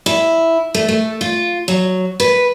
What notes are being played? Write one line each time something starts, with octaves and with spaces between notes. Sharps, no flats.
E4
A3
A3
F4
F#3
B4